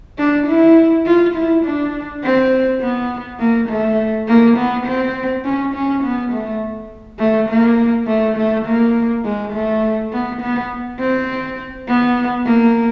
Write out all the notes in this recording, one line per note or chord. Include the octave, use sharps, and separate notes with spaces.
D4
E4
F4
E4
D4
C4
B3
A#3
A3
A#3
B3
C4
C#4
C#4
B3
A3
A3
A#3
A3
A3
A#3
G#3
A3
B3
B3
C4
B3
A#3